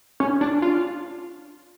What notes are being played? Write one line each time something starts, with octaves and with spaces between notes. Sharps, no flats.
C#4
D4
F4